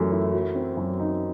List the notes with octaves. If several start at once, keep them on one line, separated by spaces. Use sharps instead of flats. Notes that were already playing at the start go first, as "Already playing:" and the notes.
Already playing: F#2 E3 A3
E4
F#3
C4
F#2
D#4